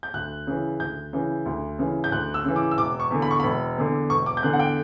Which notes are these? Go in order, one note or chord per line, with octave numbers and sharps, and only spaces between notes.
G6
D2 F#6
C#3 E3
D2 G6
C#3 E3
D2
C#3 E3
G6
D2 F#6
E6
C#3 E3
D6
E6
E1 D6
C#6
E2 D3
B5
C#6
E1 B5
E2 D3
E1 C#6
D6
G6
E2 D3 F#6
F#5
G5